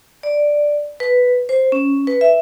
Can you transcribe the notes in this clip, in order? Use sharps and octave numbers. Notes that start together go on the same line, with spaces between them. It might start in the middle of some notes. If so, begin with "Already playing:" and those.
D5
B4
C5
C#4
B4
E5